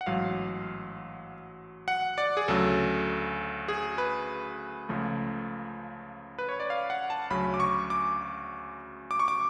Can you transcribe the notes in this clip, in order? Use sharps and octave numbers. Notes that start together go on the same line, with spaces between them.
F#5
A1 G#2 F#3 F5
F#5
D5
G#4
D2 C#3 F#3 A4
G#4
B4
C#2 C#3 F3 A3
B4
C#5
D5
F5
F#5
A5
D2 C#3 F#3 C#4 B5
D6
C#6
D6
D6
C#6
D6